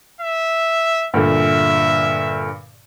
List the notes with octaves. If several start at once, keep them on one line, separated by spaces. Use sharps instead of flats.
E5
G2 A#2 D3 E5